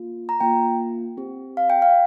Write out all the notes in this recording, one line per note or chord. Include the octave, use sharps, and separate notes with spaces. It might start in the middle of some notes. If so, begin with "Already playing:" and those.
Already playing: A#3 F4
A#5
A#3 F4 G5
C4 G4
F5
G5
F5